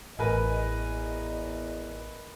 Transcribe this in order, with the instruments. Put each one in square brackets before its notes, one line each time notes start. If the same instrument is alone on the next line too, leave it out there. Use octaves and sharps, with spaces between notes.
[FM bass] A1 [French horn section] E2 D#5 [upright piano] A#4 B4 G#5